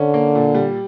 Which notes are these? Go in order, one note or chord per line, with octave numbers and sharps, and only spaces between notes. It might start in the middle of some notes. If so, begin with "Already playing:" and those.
Already playing: D3 C#4
A#3
A#2
G3